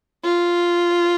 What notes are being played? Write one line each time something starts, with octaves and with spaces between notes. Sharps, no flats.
F4